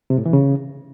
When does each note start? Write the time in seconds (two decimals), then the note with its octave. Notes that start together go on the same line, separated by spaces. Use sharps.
0.10 C3
0.18 A2
0.26 E3
0.33 C#3